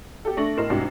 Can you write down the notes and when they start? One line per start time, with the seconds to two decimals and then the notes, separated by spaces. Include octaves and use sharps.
0.25 G4 A4
0.37 A3 D4 C#6 A#6 F#7
0.57 A2 A#4 D#5 C6 C7 E7
0.70 C2 G#2 D4 F#4 G4 C7